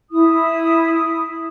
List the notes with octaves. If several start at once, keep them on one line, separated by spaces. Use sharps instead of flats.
E4 D#6